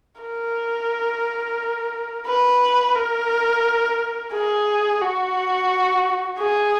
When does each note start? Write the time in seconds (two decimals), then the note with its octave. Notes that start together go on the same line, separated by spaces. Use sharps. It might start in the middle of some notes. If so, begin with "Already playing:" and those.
0.21 A#4
2.27 B4
2.96 A#4
4.33 G#4
5.01 F#4
6.39 G#4